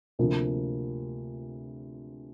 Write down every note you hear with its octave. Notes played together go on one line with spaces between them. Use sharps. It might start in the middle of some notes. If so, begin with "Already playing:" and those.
D2 C3 F3 A#3